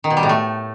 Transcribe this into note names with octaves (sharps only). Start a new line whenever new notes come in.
D#3
B2
G3
A2
A3